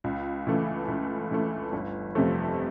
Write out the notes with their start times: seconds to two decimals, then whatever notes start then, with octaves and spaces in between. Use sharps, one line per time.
0.04 C#2
0.47 C#3 E3 A3
0.88 C#2
1.31 C#3 E3 A3
1.73 G1
2.15 F2 C3 F3 A3